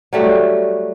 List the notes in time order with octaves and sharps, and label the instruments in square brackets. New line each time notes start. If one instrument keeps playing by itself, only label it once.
[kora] F#3 G3 A3 F#4